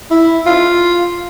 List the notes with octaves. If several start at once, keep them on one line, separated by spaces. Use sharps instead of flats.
E4
F4